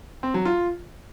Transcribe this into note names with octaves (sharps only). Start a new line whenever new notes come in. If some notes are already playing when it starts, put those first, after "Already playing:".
C4
F#3
F4